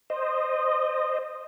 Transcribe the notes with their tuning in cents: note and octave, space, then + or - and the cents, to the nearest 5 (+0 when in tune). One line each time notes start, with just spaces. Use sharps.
C5 +0 D#5 -15